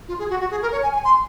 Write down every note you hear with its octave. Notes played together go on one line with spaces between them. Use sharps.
F4
G#4
F#4
F#4
G#4
A#4
C#5
G#5
G#5
C6